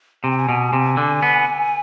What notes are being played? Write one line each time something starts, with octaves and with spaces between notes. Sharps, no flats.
C3 G#5
G5
G#5
B2
C3
D3
B3